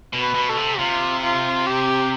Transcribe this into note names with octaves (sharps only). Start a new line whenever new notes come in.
B2
B4
B2
A4
C3
C3 F4
F4
G4